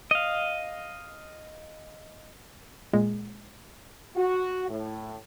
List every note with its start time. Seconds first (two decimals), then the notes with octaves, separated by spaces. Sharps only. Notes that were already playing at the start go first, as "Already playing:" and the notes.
0.11 D#5 F5
2.93 A#2 G#3
4.16 F#4
4.68 A2